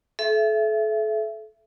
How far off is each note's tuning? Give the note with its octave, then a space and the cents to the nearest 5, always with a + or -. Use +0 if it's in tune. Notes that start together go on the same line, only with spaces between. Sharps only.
A4 -35 E5 +20